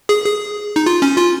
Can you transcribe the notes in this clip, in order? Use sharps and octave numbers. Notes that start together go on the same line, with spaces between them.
G#4
G#4
D#4
F4
C#4
F4